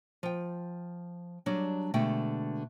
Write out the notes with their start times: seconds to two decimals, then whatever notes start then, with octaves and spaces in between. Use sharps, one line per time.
0.23 F3 G5
1.46 F#3 G3 D4
1.94 B2 D3 G#3 A3 G5